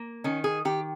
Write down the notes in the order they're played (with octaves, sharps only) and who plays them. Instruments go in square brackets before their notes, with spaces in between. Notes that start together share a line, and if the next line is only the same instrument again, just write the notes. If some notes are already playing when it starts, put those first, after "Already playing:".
Already playing: [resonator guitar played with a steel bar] A#3
D#3 C#4
G#4
D#3 G4